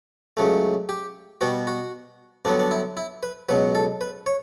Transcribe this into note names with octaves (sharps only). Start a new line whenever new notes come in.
C#2 C#3 F#3 A3
G4
B2 G3 B3 F#4
F#4
G2 D3 F#3 B3 D4
D4
E4
E4
B4
C#2 B2 F#3 B4
A4
B4
C#5